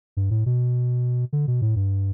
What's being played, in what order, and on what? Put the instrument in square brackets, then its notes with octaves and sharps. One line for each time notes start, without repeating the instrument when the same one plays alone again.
[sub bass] G2
A2
B2
D3
B2
A2
G2